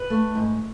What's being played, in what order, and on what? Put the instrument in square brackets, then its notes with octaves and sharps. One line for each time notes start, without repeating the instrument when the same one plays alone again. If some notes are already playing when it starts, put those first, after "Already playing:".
Already playing: [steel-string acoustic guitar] B4
A3
G#2